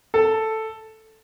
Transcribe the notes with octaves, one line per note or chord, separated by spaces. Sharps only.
A4